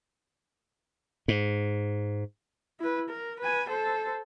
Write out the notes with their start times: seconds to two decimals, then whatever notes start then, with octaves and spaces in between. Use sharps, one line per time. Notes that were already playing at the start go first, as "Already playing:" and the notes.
1.28 G#2
2.80 E4 B4
3.09 A#4
3.40 B4 G#5
3.69 A4 C5